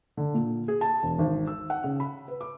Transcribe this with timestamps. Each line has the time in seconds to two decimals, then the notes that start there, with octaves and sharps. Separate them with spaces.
0.17 D3
0.34 A#2
0.68 G#4
0.81 A5
1.03 E1
1.19 G#1
1.47 E6
1.70 F#5
1.84 C#3
2.00 B5
2.28 B4
2.41 D6